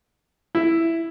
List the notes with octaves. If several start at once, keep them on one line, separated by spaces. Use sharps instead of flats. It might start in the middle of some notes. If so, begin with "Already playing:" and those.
E4